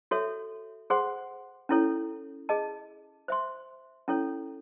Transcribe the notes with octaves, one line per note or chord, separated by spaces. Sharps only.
F#4 A4 C#5 E5
G#4 C5 F#5 C6
C#4 E4 A4 C#5
G#4 D#5 A5
C5 E5 C6
C#4 E4 A4 C#5